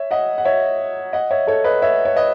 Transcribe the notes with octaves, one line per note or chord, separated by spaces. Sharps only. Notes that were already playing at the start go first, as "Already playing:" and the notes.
Already playing: C#5 E5
D#5 F#5
F#5
C#5 E5
D#5 F#5
C#5 E5
A4 C#5
B4 D#5
C#5 E5
C#5
B4 D#5